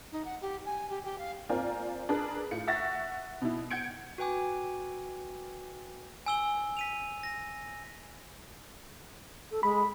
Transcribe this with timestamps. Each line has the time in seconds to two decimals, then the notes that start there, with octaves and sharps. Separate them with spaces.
0.12 D#4
0.24 F#5
0.41 G4
0.65 G#5
0.90 G4
1.04 G4
1.18 F5
1.49 A#3 C4 F4 A#4 D5 G#5
2.09 D4 G#4 A#4 B4
2.51 A2 F4 C#7
2.68 E5 F#5 C#6 A6 A#6
3.42 B2 E4
3.70 F#5 G6 G#6 C#7 D7
4.18 F#4 B4 G5 G#5 D6
6.26 G#5 E6 G7
6.77 B6 D#7 F7
7.23 A#6
9.51 A4
9.63 G#3 B5